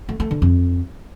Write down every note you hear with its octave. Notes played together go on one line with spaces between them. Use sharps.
A3
A3
D3
F2